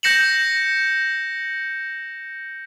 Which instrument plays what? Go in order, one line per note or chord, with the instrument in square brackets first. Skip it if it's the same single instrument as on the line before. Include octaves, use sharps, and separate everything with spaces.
[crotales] G6 A#6 C#7 E7 F#7